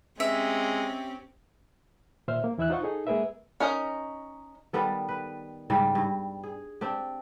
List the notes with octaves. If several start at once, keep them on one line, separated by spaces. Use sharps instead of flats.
G#3 C4 C#4 G4 E5
A#2 D#3 C5 E5 F6
A#3
D#2 E3 E4 E5 E6 F#6
D#4 F4 C5 F#5 C#6
D#4 G#4 A4
G#3 A#3 G#4 A#4 B4 E5
C#4 D#4 A#4 D#5
D#3 G3 B3 A4
B4
G#2 C#3 G3 G4
G2
G#4
C4 D4 G4